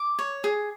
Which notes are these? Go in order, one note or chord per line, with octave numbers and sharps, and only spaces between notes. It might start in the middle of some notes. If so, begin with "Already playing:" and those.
Already playing: D6
C#5
G#4